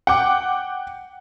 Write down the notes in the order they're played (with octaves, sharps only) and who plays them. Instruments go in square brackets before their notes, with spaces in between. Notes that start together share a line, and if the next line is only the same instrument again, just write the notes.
[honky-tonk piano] F#5 G5 D6